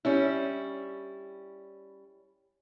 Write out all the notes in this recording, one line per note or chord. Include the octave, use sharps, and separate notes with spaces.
G3 C#4 E4